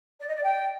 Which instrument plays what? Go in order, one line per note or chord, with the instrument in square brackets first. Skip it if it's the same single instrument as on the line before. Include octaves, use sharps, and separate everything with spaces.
[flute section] D5
D#5
D5
G5